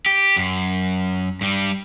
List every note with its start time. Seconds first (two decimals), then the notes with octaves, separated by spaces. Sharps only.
0.06 G4
0.36 F#2
1.41 G2 G3